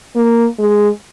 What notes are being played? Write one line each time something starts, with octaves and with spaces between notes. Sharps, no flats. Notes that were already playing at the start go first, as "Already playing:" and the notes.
A#3
G#3